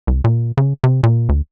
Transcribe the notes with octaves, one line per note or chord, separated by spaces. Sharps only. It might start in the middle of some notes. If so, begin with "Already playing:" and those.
C2
A#2
C#3
C3
A#2
D2